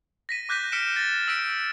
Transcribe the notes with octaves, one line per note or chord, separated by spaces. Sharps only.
A#6 B6 D#7
D6 F#6 G6 A#6 B6 D#7
F6 B6 C#7 D7 E7
A6 A#6
E6 B6 D7